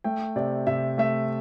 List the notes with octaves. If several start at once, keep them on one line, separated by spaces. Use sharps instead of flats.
A3 G5
C3 D5
C3 E5
A3 E5